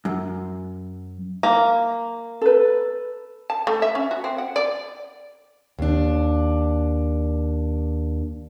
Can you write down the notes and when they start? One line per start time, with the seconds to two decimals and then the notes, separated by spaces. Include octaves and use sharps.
0.05 F#2
1.43 A#3
2.41 A4 B4
3.50 A5
3.67 A3
3.82 E5
3.95 C#4
4.11 F#4
4.24 C4
4.38 F#5
4.56 D5
5.79 D#2 D4